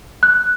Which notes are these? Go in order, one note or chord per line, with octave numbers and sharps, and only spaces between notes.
F#6